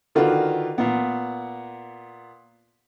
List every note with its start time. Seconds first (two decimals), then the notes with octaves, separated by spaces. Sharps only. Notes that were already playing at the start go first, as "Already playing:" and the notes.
0.15 D3 D#3 F4 F#4 B4
0.78 A#2 B3